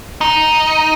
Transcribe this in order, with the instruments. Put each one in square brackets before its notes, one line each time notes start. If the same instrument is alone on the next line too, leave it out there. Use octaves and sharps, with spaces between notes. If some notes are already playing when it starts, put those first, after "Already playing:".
[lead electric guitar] D#4